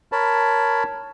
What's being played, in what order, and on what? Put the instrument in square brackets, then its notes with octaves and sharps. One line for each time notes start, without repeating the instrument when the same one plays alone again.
[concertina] A#4 C#5 A5 B5